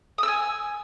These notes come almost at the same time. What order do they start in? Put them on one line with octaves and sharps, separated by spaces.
D#6 E6 G#5